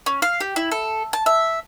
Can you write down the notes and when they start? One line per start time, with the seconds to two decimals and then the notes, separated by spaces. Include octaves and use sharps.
0.06 C#4
0.22 F5
0.40 G4
0.56 E4
0.71 A4
1.13 A5
1.26 E5